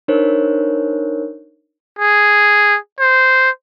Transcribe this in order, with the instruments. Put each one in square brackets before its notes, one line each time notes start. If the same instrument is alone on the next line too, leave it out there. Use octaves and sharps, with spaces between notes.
[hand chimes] D4 D#4 A#4 C5 C#5
[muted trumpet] G#4
C5